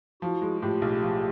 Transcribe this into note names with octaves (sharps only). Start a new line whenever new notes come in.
F3 E4 F#4
G#3
A2 F4 G4
B1
F3